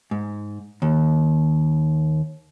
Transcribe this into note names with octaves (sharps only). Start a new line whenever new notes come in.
G#2
D#2